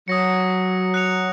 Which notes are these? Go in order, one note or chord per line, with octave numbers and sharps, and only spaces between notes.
F#3 D#6 A#6 C#7
F#6 C#7 F7